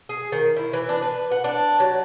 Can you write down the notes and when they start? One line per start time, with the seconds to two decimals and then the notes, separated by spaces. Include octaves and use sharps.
0.09 G#4
0.32 D#3
0.57 E4
0.73 E3
0.89 D4
1.02 B4
1.31 F#5
1.44 D4
1.80 F#3